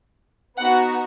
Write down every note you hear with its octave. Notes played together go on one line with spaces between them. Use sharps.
B3 D#4 F#4 F#5